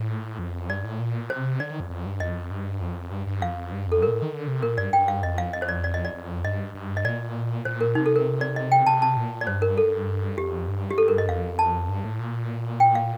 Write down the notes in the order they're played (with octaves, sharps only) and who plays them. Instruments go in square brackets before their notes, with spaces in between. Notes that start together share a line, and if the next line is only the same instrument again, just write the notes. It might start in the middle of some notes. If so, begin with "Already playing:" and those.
Already playing: [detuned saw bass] A2
F2
[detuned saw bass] G2 [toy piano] D5
[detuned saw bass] A2
A#2
[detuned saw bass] C3 [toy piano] C5
[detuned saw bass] D3 [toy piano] D5
[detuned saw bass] D#3
F2
F2
G2
[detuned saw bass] F2 [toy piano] D#5
[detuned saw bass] G2
F2
G2
G2
[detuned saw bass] F2 [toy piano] F5
[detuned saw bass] G2
[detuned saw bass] F2 [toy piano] A4
[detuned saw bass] G2 [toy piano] A#4
[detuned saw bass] A#2
A2
D#3
D3
C3
[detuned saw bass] A#2 [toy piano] A#4
[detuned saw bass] G2 [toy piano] D5
[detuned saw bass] G2 [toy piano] G5
[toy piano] F5
[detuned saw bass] F2 [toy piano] D#5
[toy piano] F5
D#5
C5
D5
D5
D#5
D5
[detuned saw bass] F2
[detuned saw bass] G2 [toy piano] D#5
[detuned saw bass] G2
[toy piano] D#5
[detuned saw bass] A#2 [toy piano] D5
[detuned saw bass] A#2 [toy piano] C5
[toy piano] A#4
[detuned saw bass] C3 [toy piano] D#4
[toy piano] A4
A#4
D5
D#5
G5
[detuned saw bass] C3 [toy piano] A5
[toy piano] A5
[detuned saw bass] A#2
[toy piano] D5
[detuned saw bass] G2 [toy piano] C5
[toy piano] A#4
A4
[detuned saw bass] F2 [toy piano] G4
[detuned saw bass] G2
[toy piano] G4
A4
A#4
D#5
[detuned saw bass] F2 [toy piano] F5
[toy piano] A5
[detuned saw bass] G2
A2
A#2
[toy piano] G5
F5